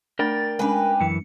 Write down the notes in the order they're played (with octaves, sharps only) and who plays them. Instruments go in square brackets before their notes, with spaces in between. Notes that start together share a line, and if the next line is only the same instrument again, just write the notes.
[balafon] A3 D4 [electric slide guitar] A#4 D5 G5 [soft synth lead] A6
[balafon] G#3 C#4 D4 [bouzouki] G4 B4 [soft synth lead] G#5
[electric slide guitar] F#2 E3 [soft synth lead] C#7